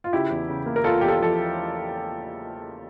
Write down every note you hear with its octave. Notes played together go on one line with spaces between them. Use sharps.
F4
C#3 E4 G4
E2
C#3
A#3
A#4
E2 F4 A4
E2 G4
F4 A4
F3 A4